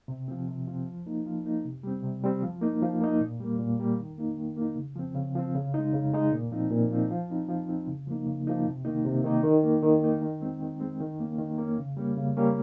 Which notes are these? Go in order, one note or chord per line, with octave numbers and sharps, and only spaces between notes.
C3
F3 C4
C3
F3 C4
F3
A#3 D#4
F3
A#3 D#4
C3
G3 C4
C3
G3 C4
F3
A#3 D#4
F3
A#3 D#4
A#2
G3 A#3
A#2
G3 A#3
D#3
A#3 D#4
D#3
A#3 D#4
C#3
F3 C4
C#3
F3 C4
C#3
G#3 D#4
C#3
G#3 D#4
A#2
F3 C4 D#4
A#2
F3 C4 D#4
F3
C4 D#4
F3
C4 D#4
C#3
F3 A#3 D#4
C#3
F3 A#3 D#4
C3
D#3 A#3 D#4
C3
D#3 A#3 D#4
D#3
A#3 D#4
D#3
A#3 D#4
D#3
G#3 C4
D#3
G#3 C4
D#3
A#3 C#4
D#3
A#3 C#4
C#3
G3 A#3 C#4
C#3
G3 A#3 C#4